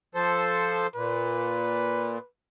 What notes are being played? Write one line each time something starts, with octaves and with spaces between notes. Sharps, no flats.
F3 A4 C5
A#2 B4